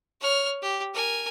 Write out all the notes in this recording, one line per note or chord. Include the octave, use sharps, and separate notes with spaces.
C#5 F6
G4
A#4 G#5